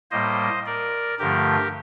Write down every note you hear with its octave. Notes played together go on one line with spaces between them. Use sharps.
A2 G3 A#3 C5 D#5
A#4 D5
G2 D3 F3 A3 G4 A#4